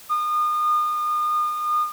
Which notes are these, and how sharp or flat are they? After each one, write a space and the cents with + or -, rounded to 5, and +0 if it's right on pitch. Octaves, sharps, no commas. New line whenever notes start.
D#6 -35